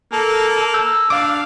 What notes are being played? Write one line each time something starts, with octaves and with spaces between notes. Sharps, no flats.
A#3 A4
E6 G6
D4 F5 D6